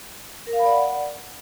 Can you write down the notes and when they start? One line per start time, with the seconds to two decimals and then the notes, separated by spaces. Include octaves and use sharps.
0.47 A#4
0.53 F5
0.59 B5
0.65 D5
0.71 F#5